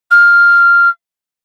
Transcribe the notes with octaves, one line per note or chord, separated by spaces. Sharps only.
F6